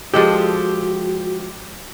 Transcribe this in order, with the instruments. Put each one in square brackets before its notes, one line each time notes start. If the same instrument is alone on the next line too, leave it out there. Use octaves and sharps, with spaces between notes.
[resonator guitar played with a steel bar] F3 G#3 A4 [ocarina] F#4 [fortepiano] G4